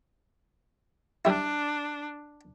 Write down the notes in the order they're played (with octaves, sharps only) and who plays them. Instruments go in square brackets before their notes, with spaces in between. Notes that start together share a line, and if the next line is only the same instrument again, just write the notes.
[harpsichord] G3 E4 [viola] D4